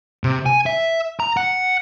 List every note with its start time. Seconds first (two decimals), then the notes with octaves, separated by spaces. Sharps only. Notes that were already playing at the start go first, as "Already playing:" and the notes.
0.24 C3
0.46 G#5
0.66 E5
1.20 A#5
1.37 F#5